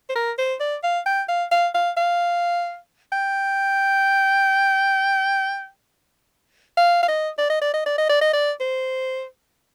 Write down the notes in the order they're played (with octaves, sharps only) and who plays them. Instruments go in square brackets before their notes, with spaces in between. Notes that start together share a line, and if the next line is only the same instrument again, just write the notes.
[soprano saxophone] C5
A#4
C5
D5
F5
G5
F5
F5
F5
F5
G5
F5
F5
D#5
D5
D#5
D5
D#5
D5
D#5
D5
D#5
D5
C5